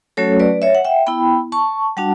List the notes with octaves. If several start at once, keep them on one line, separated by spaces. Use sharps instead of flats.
F#3 A3 C#4 F#4 A4 C#5
B4 D5
C#5 E5
F#5
E5 G5
B3 E4 G5 B5
A5 C#6
G3 D4 F#4 F#5 A5